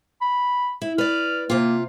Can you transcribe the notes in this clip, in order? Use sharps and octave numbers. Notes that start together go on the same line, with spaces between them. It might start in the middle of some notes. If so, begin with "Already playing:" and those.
B5
E4
B4 D5 F6
C3 A#3 F4